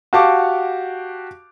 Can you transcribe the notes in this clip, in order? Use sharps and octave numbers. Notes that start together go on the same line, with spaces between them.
F#4 G4 F5 A5 C#6 D6